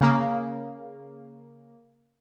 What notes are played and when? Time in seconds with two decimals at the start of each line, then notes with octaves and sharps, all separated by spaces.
0.01 C#3 A#3